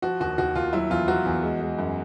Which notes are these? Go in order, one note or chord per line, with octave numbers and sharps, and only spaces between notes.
F3 F#4
D#2 F#4
D#2 F#4
D#2 F4
F#3 E4
E2 F4
F#3 F#4
E2
G#3
G#3
F#2